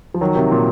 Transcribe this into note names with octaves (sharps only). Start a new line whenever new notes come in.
F3
D#3 F#3
C3 D#3
A#2